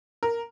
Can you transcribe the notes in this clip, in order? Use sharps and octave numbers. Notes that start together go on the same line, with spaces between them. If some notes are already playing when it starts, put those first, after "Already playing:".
A#4